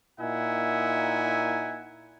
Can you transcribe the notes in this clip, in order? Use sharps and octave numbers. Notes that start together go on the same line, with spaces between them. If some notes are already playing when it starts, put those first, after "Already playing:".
A#2 D#4 E4 E5 F#5 G#5